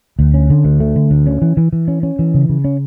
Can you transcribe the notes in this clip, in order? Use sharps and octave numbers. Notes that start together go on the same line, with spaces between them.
D2
C#4
D3
D2
A3
D3
D2
C#4
E3
E3
E3
C#4
C#4
E3
C#3
C#3
C#4